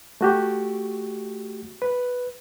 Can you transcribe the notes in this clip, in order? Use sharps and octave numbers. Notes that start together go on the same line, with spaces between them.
A3 F#4 G4
B4